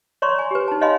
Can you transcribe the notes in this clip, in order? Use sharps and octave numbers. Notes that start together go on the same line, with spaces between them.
C#5 D5 A#5 C6 C#6
G#5
G4 B4
D#4 A5
C#5 D#5 F5 G#5 B5 C6